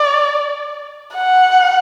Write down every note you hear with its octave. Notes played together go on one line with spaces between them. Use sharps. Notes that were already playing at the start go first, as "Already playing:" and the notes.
Already playing: D5
F#5